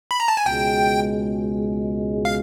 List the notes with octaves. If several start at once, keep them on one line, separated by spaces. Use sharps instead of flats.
B5
A#5
A5
G#5
C#2 B2 G#3 G5
F5